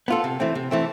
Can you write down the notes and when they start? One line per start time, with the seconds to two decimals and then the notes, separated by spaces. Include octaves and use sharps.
0.08 B3 F4 A4
0.24 C3
0.40 E3 A3 C4
0.55 C3
0.71 E3 A3 C4